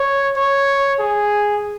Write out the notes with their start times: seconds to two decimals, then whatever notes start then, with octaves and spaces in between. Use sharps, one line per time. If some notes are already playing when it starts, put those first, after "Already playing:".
Already playing: C#5
0.36 C#5
1.00 G#4